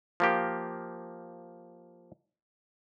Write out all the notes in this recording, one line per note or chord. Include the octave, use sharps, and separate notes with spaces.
F3 A#3 G4